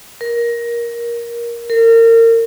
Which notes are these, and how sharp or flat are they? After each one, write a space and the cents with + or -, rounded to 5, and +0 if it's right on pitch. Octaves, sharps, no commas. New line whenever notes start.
A#4 +15
A#4 -30